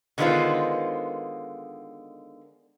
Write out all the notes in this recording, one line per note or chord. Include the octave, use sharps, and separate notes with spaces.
D3 D#3 G#3 B3 F4 C5